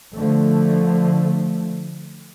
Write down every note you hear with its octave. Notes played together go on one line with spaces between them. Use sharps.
D3 F3 A3